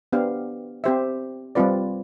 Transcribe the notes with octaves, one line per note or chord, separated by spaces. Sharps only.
B3 D4 G4 C5 F5
C4 G4 C5 E5
G3 C4 F4 B4 D5